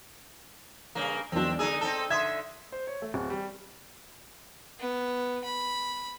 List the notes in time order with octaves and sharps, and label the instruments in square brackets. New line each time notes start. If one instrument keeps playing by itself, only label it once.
[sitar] G2 C#3 A#3
[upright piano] E1 B1 [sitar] C4 D4
[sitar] D3 D#4 G#4 [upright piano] E6
[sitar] C4 D#4 A4 [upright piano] G7
[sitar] D3 E5 [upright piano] C6 D#6 G#6
[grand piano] C5
C#5
A3
D1
G3
[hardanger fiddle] B3
B5